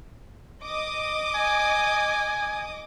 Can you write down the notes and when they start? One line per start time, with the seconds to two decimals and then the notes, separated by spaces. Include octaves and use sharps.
0.62 D#5 D6 D#6
1.35 G#5